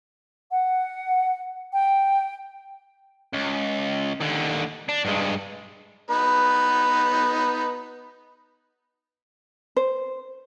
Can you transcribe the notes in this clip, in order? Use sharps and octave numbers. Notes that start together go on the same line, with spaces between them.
F#5
G5
C#2
D#2 D3
D4
G2 G#3
B3 D#4 B4
C5